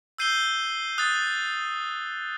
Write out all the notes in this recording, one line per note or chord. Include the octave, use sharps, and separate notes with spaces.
E6 G6 C7 D#7 G7
D#6 F#6 A6